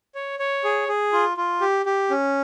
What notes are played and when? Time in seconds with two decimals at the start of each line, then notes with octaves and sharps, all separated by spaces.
0.15 C#5
0.39 C#5
0.64 G#4
0.88 G#4
1.13 F4
1.37 F4
1.61 G4
1.86 G4
2.10 C#4